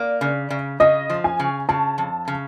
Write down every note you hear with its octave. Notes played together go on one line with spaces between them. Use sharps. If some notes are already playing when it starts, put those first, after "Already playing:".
Already playing: A#3 D5
C#3
C#3
C#3 D#5
F3
G#5
C#3
C#3 A5
F2
C#3